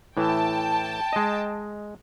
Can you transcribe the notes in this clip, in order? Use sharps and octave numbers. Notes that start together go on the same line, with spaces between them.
A2 E3 G5 A5
G#3 D#5